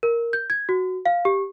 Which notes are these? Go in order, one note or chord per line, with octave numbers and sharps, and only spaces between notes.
A#4
G6
G#6
F#4
F5
G4